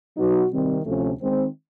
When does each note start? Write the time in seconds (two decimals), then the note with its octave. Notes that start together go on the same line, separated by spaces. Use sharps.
0.17 B2 F#3 B3 D#4 F#4
0.51 C3 D#3 G3 C4
0.85 D2 C3 F3 A3 C#4
1.19 D#3 G#3 C4